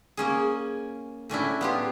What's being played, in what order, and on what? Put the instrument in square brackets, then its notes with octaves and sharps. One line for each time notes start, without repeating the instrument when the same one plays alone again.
[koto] A#3 C#4 G#4
A2 C#4 D4 E4
B3 F4 G4